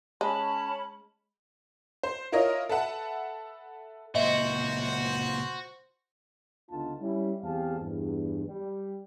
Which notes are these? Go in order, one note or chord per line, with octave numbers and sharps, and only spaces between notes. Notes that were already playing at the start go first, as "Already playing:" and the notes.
G#3 C#4 A5 B5
C5
E4 F4 A#4 C#5 D#5
A4 B4 E5 F#5 A5
C#2 A#2 F#4 C5 D#5 E5
C#2 D3 B3 D#4 F4 A5
G3 C#4 E4
E2 C4 G4 G#4 F5 A5
E2 G2
G3